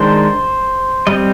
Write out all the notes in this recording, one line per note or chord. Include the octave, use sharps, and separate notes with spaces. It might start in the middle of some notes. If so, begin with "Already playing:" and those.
Already playing: D#3 G#3 D4 C5
G3 C4 D#5